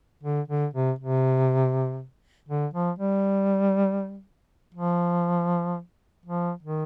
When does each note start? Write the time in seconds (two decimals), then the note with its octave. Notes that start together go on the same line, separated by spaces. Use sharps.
0.23 D3
0.48 D3
0.74 C3
0.99 C3
2.49 D3
2.74 F3
2.99 G3
4.74 F3
6.26 F3
6.63 D#3